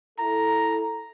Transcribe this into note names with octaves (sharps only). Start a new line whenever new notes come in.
E4 A4 A#5